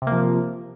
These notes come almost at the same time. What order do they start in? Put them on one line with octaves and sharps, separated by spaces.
C3 A#3 F3